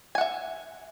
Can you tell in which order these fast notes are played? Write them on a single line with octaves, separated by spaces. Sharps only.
G#5 F#5 E5